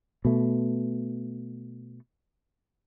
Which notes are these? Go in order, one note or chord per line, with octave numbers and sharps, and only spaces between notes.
B2 A3